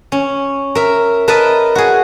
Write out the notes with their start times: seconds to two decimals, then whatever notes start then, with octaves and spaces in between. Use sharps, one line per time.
0.12 C#4
0.75 A#4 E5
1.28 A#4 B4 D#5 E5 A5
1.75 F#4 G#4